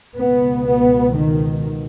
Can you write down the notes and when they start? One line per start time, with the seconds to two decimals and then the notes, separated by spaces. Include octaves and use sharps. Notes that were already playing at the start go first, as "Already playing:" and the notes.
0.17 C#2 B2 B3
0.66 B3
1.16 D#3